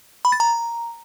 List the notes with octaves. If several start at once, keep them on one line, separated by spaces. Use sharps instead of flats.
B5
A6
A#5